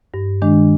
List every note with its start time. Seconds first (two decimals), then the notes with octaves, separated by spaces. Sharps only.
0.14 G2
0.42 D#3 G#3 D4